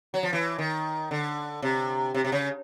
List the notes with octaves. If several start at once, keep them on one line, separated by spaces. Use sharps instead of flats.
F#3
F3
E3
D#3
D3
C3
C3
C3
C#3